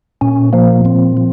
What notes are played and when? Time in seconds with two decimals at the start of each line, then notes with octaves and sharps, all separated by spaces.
0.21 A#2 C#4
0.53 F3 A#3
0.85 A#2 C4
1.17 F3